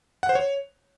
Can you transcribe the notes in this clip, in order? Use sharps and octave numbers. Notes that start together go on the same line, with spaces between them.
F#5
C5
C#5